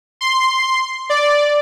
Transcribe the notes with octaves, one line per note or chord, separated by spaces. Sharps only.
C6
D5